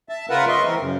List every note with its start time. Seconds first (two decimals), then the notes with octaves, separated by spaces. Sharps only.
0.09 E5 A5
0.30 C#3 F4 A#4 B4 E5 F#5
0.48 D#5 E5 C6 C#6
0.65 E3 C4 A#4
0.79 F#2 C#3